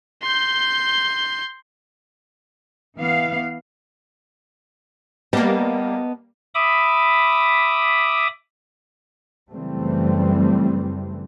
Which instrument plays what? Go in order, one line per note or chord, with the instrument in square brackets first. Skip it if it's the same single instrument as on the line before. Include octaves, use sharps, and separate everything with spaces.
[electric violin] C6 G6
[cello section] E3 B3 F5
[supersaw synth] G3 A#3 [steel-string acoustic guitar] B3 D#5 A5
[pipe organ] E5 B5 D6 D#6
[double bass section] F#2 C#3 E3 G3 A3 C4